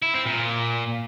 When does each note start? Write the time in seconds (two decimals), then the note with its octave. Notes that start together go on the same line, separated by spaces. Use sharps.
0.02 E4
0.14 C4
0.26 A#2